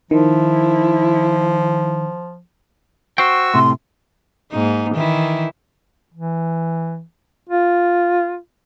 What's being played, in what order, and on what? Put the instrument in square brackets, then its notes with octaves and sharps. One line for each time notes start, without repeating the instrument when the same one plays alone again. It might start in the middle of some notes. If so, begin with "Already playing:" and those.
[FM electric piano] D#3 [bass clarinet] F3 [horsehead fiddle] E4
[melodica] F#4 C#6 E6 [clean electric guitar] C5 G5
[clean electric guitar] A2 C3 [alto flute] C6
[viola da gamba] G#2 A#3 D#4
D#3 E3 E4
[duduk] E3
F4